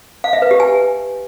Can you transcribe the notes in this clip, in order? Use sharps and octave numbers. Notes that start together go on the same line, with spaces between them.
F5
E5
B4
G4
G#5